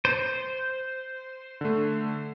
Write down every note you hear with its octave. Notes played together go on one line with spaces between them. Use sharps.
C5
D3 A3